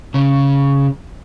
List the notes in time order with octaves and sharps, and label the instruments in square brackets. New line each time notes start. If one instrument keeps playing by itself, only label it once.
[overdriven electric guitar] C#3